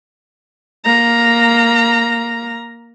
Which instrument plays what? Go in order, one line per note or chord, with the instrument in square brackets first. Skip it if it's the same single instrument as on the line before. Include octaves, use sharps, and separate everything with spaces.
[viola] A#3 A#5